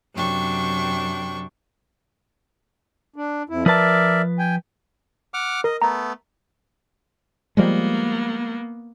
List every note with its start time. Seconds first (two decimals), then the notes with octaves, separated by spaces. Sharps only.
0.14 F#2 C3 F#3 D4 G5 C#6
3.16 D4
3.49 F2 E4
3.66 F3 A#4 B4 D5 E5 A5
4.39 G5 G#5
5.34 F#5 D6 F6
5.64 A#4 D#5
5.82 A3 B3 A#5
7.57 F3 G3 G#3 A#3 B3